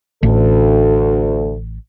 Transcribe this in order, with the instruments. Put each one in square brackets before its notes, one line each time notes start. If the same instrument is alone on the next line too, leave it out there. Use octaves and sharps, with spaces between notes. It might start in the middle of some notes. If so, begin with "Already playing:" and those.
[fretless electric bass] A1 [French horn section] D2 A4